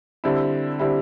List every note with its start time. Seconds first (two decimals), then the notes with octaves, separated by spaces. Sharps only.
0.24 D3 G3 C4 E4
0.79 D3 G3 C4 E4